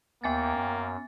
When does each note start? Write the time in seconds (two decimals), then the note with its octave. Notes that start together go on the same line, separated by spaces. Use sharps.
0.24 D#2 A#3 B3 G5 G#5 A6
0.56 F#2